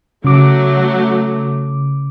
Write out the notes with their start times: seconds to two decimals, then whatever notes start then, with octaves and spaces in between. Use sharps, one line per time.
0.25 C#3 F#3 A3 D6